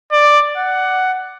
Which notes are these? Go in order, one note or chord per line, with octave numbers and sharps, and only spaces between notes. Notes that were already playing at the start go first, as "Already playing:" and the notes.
D5
F#5